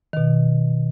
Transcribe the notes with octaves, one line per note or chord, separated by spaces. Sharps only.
B2 D#3